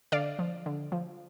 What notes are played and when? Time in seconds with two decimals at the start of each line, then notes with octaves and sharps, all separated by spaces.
0.12 D3 D5 F5
0.39 F3
0.66 D3
0.92 F3